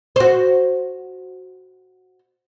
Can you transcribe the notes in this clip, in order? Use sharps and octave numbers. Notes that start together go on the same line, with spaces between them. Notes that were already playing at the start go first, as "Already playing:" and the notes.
F#4 C5